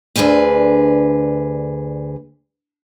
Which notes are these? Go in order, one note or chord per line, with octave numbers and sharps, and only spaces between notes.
D2 G#2 D3 G#4 B4